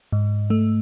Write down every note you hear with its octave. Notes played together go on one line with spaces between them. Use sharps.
G#2
A3